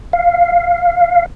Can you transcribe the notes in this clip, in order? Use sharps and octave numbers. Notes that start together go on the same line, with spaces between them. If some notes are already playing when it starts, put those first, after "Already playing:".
F5